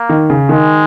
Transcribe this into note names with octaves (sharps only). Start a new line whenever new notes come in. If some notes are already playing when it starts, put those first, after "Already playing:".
Already playing: A#3
D#3
C#3
D#3 G#3